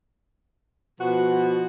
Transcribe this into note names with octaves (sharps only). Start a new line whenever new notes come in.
B2 F3 F#4